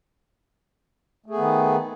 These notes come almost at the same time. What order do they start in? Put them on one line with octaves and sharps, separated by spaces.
A3 G#4 B3 D#3